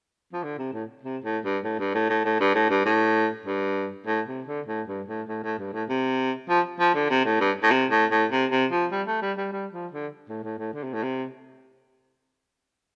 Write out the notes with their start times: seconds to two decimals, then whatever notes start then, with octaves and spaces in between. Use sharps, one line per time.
0.33 F3
0.43 D3
0.58 C3
0.74 A2
1.03 C3
1.24 A2
1.44 G2
1.64 A2
1.79 G2
1.94 A2
2.10 A2
2.25 A2
2.40 G2
2.55 A2
2.70 G2
2.85 A2
3.46 G2
4.07 A2
4.28 C3
4.47 D3
4.68 A2
4.88 G2
5.08 A2
5.28 A2
5.43 A2
5.59 G2
5.73 A2
5.89 C3
6.49 F3
6.80 F3
6.95 D3
7.10 C3
7.25 A2
7.41 G2
7.63 A2
7.71 C3
7.91 A2
8.11 A2
8.31 C3
8.51 C3
8.72 F3
8.92 G3
9.07 A3
9.22 G3
9.38 G3
9.53 G3
9.73 F3
9.93 D3
10.29 A2
10.44 A2
10.59 A2
10.73 D3
10.84 C3
10.93 A2
11.03 C3